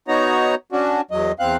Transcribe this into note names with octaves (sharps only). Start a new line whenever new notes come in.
B3 D#4 F#4 C#5 A#5
C#4 D4 F#4
E2 F#3 D#5
E2 C4 F5 F#6